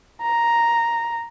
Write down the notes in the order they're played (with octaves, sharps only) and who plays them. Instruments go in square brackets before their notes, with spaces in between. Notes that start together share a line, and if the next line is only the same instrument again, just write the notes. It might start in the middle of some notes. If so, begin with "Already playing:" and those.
[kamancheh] A#5